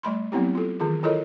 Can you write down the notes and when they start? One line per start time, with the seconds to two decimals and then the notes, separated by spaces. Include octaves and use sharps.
0.03 G3 A3 B5 C6
0.32 F#3 B3 C4 E4 G4
0.55 F4 A4
0.80 D#3 E3 F4 G#4
1.03 E4 F4 A4 A#4 C#5 D#5